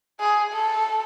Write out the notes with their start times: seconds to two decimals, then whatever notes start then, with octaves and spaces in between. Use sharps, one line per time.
0.20 G#4
0.53 A4